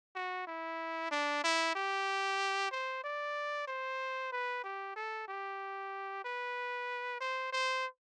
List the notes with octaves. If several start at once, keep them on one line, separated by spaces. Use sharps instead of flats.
F#4
E4
D4
E4
G4
C5
D5
C5
B4
G4
A4
G4
B4
C5
C5